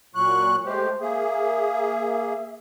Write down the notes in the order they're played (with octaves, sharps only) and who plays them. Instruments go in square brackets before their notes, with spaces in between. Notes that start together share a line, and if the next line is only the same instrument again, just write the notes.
[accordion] A#2 F#3 F#6 [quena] C#6
[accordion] G#3 A3 G4 [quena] C5
[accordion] A#3 G#4 [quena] E5